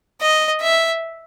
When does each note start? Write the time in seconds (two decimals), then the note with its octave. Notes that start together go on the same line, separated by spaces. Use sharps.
0.21 D#5
0.61 E5